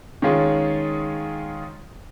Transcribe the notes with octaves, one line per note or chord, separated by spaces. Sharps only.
D#3 G#3 C#4 F4 G#4